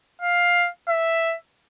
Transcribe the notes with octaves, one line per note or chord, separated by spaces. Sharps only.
F5
E5